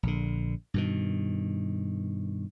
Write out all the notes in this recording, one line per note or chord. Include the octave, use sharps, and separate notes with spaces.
A#1 D3
G2 B2 D#3